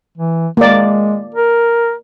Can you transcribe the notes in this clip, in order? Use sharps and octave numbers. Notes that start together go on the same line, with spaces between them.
E3
G#3 A#3 D5
A#4